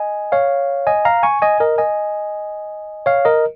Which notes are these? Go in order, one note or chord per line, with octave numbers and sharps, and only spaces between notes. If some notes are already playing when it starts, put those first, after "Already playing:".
Already playing: D#5 G#5
C#5 F5
D#5 G#5
F5 A#5
G#5 C#6
D#5 G#5
A#4 D#5
D#5 G#5
C#5 F5
A#4 D#5